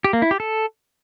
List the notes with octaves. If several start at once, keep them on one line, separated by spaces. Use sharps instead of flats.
G4
A#3
E4
G4
A4